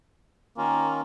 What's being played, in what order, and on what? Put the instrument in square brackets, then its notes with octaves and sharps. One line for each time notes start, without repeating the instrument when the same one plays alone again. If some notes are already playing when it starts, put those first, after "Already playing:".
[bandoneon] D#3 C#4 F4 [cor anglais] A#3